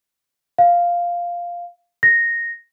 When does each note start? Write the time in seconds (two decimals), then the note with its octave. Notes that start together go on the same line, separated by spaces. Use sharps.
0.58 F5
2.03 A#6